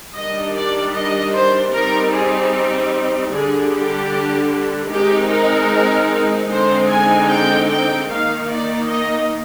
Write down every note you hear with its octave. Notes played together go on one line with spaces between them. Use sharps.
D#3 G3 D4 D#5
D5
D#5
C5
G3 C4 D#4 A#4
G#4
D3 G3 D4 G#4
G4
D#3 G#3 C4 D#4 G4
A#4
D3 G#3 C4 D#4 C5
G#5
G5
G5
D#3 A#3 D#4 F5
D5
D#5